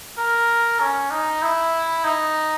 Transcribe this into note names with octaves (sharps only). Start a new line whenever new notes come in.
A#4
C#4
D#4
E4
D#4